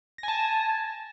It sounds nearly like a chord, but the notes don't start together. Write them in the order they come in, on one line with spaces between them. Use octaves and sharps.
A#6 G#5 A5